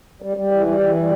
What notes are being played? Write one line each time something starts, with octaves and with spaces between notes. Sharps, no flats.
G3
G3
E3
G3
E3
G3